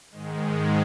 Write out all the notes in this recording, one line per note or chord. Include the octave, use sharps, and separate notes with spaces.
G#2 D#3 G#3